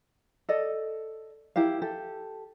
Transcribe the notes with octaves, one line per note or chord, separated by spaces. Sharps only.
A4 D5 D#5
E4 G4 A#4 F5
G4 A4